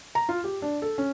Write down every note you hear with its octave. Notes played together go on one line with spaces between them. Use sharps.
A#5
F4
G4
D4
A4
C#4